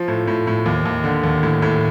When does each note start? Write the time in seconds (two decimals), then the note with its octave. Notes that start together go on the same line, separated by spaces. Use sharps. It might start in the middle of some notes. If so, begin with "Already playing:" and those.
Already playing: F3
0.08 A2
0.27 A2
0.47 A2
0.66 D#2
0.85 D#2
1.04 D3
1.23 D#2
1.43 A2
1.62 A2